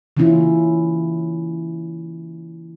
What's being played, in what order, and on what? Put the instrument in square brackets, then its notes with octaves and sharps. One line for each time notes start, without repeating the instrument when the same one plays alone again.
[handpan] C#3 E3 A#3 C#4 E4 F4